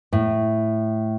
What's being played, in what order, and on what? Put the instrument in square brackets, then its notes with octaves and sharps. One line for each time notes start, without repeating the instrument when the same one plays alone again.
[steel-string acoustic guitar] A2